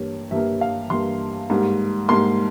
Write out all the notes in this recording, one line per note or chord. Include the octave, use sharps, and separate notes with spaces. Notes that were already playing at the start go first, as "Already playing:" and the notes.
Already playing: G2 G3 A#3 C#5
G2 G3 A#3 E5
F5
G2 G3 A#3 C6
G#2 G3 A#3
G#2 G3 A#3 C6